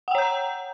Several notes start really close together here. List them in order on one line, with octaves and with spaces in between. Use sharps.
F#5 G5 C#5 G6 A#5